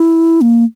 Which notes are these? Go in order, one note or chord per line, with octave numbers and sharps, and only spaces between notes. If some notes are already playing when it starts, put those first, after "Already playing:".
Already playing: E4
A#3